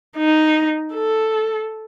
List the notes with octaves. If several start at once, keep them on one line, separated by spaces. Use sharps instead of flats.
D#4
A4